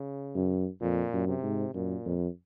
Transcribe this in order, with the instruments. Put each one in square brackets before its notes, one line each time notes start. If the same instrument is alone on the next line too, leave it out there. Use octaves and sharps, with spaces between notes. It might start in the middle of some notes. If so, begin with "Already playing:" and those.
Already playing: [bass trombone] C#3
[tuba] F#2
[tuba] F2 [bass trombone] A#2
[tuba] F#2
[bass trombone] C3
[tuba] G#2
[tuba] F#2 [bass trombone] A#2
[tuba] F2